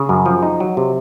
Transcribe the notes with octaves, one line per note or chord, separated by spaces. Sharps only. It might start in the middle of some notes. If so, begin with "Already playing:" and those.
Already playing: C#3 G#4
F#2
F3
D#4
F#3
C3